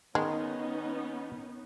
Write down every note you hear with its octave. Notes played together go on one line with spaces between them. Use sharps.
D#3 G#3 B3 C#4 D#4